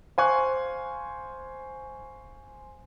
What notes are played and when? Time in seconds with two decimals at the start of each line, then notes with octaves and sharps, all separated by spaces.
0.18 C5 F5 G#5 C#6 F#6